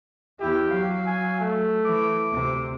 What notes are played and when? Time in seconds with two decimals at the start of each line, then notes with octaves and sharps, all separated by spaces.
0.40 E2 E4 G4
0.70 F#3 F5
1.07 G#5
1.40 A3
1.85 E3 D6
2.29 D2 C3